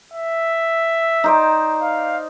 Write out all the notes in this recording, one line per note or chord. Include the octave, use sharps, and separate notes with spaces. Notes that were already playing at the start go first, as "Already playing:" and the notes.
E5
D#4 C5 D5
F5